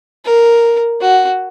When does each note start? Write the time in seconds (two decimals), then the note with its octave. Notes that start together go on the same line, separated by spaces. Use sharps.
0.25 A#4
1.01 F#4